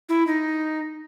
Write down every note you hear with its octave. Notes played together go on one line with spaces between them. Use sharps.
E4
D#4